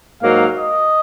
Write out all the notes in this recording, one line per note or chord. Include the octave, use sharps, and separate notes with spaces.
G#2 F#3 A#3 F5
D#5